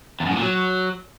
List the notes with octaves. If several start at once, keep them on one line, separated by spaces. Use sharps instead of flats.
E2
F#2
A2
A#2
F#3